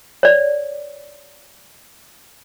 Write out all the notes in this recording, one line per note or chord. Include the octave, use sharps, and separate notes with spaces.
C#5 D5